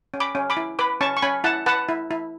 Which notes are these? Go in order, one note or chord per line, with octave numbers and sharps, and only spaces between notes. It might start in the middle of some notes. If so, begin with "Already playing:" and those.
C#4
B5 D6
C#4
B5 D6
E4
B4 B5 D6
C#4 A5 C#6
C#6
C#4 G#5 B5
E4 F#5 A5
B4 F#5 A5
E4
E4